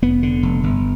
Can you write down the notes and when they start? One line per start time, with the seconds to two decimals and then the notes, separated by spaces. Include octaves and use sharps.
0.02 F1 B3
0.23 D3
0.43 F1
0.63 G1